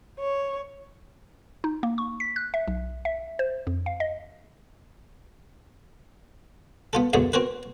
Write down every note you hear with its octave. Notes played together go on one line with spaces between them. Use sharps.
C#5
D#4
A#3
C#6
B6
F#6
E5
B1
E5
C5
F2
F5
D#5
B3 F4 A4
C#2 F#2 A2 D3 B3
C4 F#4 A#4 B4